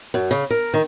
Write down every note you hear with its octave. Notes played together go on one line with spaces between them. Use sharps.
F#2
C#3
A#4
D#3